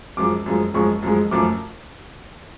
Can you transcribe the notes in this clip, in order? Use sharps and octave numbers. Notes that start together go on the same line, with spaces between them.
F#2 F3 G#3 D6
F#2 F3 G#3
F#2 F3 G#3 C#6
F#2 F3 G#3
F#2 F3 A3 D6